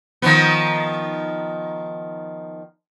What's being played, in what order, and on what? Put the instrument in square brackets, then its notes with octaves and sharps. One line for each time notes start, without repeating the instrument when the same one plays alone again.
[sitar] D#3 F3 B3